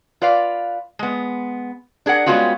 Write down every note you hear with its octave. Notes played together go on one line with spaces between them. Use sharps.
F4 B4 D5 F5
G#3 B3
D4 G#4 A#4 F#5
G3 G#3 B3 C#4 F4 F#4